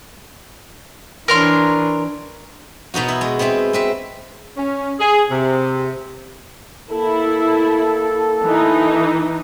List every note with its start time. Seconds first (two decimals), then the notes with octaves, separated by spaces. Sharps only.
1.28 E3 D4 A#4 C#5 C6
2.94 B2 B3 D#4 F#4
3.08 E4
3.21 G#3
3.39 B3 C4 E4 E5
3.73 C4 B4 E5
4.57 C#4
5.00 G#4
5.31 C3
6.92 A#3 E4 A4
8.45 E3 D#4